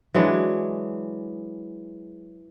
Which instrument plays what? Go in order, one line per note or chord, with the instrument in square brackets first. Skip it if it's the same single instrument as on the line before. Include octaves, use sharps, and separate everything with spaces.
[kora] E3 F#3 G#3 D4